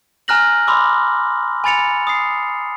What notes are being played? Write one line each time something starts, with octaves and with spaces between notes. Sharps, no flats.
G#5 A#5 F6 F#6 A#6 F#7
B5 C6 D6 E6
G#5 B5 A6 C#7 F7
D#6 C7